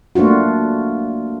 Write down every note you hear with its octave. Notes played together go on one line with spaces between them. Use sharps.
A3 A#3 D4 F4 F#4